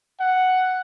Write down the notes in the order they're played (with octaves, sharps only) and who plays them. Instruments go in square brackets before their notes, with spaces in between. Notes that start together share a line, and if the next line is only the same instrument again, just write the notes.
[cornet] F#5